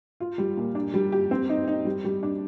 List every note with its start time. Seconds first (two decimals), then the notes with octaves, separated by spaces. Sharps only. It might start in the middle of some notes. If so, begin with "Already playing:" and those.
0.20 F4
0.38 G3
0.57 A#2
0.75 D4
0.94 G3
1.12 G4
1.31 C4
1.49 D#4
1.68 D#4
1.85 G3
2.05 G3
2.23 D4